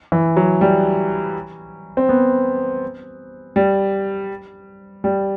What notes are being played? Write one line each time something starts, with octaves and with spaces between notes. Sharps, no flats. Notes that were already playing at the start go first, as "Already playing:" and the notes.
E3
F#3
G3
C4
B3
G3
G3